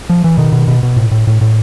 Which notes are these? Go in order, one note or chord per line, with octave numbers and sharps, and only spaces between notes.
F3
E3
B2 D#3
B2
B2
B2
A2
A2
A2
A2